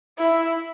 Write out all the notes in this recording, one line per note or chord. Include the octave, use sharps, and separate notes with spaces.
E4